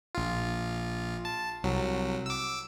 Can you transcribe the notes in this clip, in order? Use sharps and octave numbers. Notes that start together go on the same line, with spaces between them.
A#1 F4
A5
C2 F#3
D6 E6